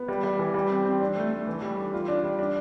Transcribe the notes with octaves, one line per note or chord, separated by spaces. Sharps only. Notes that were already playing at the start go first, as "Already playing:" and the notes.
Already playing: B3
G3
G3
E3
G3
C4
C4
D4
A3
A3
E3
G3
D4
F4
D4
G3
D4